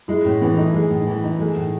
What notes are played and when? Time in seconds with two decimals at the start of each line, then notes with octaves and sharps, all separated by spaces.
0.08 G#3 E4
0.25 A2 C#4
0.41 E3 B3
0.57 A3 D#4
0.74 G#3 A3
0.90 A2
1.07 E3
1.24 D#4
1.39 G#3 A3
1.56 A2